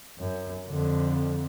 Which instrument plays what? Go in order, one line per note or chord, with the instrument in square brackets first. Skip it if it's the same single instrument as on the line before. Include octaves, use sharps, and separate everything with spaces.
[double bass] F#2
F2 D3